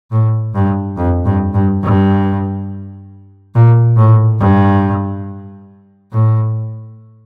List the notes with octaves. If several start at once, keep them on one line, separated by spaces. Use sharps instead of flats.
A2
G2
F2
G2
G2
G2
A#2
A2
G2
A2